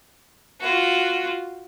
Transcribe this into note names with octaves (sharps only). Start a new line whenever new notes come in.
F4 F#4